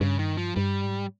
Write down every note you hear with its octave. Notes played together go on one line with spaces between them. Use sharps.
G2 C#3
D#3
F3
G2 G3
G#2